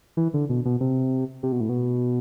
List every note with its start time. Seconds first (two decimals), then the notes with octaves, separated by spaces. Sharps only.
0.17 E3
0.34 D3
0.49 B2
0.65 B2
0.80 C3
1.43 C3
1.52 B2
1.61 A2
1.69 B2